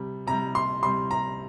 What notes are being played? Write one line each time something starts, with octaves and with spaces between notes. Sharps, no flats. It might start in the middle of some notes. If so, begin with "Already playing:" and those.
Already playing: C3 G3
C3 G3 A#5
C6
C3 G3 C6
A#5